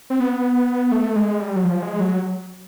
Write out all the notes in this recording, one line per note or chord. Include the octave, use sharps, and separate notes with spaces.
C4
B3
A3
G#3
G3
F#3
F3
G#3
F#3